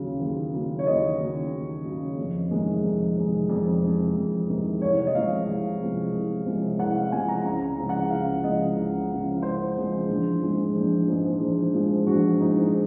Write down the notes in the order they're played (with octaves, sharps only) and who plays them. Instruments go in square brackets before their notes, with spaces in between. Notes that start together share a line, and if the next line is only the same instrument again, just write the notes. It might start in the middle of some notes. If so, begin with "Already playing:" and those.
Already playing: [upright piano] D#2 C#3 F#3
D#2
C#3 F#3
C#5
D#2 D#5
C#3 F#3
D#2
C#3 F#3
F2
C3 D#3 G#3
F2
C3 D#3 G#3
F2
C3 D#3 G#3
F2
C3 D#3 G#3
C2 C#5
C#5
D#5
C3 F3 G#3 F5
C2
C3 F3 G#3
C2
C3 F3 G#3
C2 F#5
F5
C3 F3 G#3 G#5
A#5
C#2 A#5
C#3 F3 G#3
F#5
C#2 F5
C#3 F3 G#3 D#5
C#2
C#3 F3 G#3
C#2 C5
C#3 F3 G#3
A#1
G#2 F3 G#3
A#1
G#2 F3 G#3
A#1
G#2 F3 G#3
A#1 F#4
G#2 F3 G#3 D#4